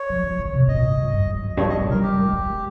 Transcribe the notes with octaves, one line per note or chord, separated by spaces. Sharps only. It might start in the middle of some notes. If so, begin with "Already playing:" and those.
Already playing: C#5
F3
F3
D#3
C3
A#2 D#5
G#2
G2
G2
G#2
F2
G2 C#5
G#2 D#5
A#2
G3 A#4
G4
G#3
G#3